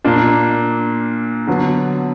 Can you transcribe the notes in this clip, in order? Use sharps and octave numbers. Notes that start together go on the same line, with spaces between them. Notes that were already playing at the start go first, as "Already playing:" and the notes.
A#2 A#3 D4
D3 F#3 B3